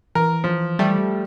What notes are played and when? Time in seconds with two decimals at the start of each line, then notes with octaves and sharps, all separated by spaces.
0.15 E3 A#4
0.44 F3
0.79 G3 A3